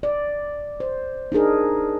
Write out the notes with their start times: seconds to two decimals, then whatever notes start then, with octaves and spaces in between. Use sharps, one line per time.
0.03 D5
0.80 C5
1.32 D4 D#4 G#4 A#4